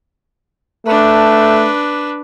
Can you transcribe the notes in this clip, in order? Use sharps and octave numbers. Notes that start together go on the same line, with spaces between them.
A3 D4 B4